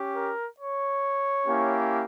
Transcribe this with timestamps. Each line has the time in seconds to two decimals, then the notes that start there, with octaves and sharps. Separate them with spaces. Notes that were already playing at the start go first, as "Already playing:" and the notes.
Already playing: C#4 G4
0.15 A#4
0.59 C#5
1.45 A#3 C#4 E4 G4